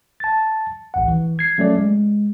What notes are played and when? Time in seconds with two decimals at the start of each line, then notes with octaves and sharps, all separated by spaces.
0.20 A5 A6
0.94 A1 D2 F#5
1.08 E3
1.39 G#6 C7
1.58 F#3 A3 C#4 A4 D5
1.77 G#3